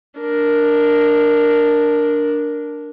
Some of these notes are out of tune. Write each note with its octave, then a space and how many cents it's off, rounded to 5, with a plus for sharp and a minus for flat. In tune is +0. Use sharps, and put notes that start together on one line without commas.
D4 +0 A#4 +0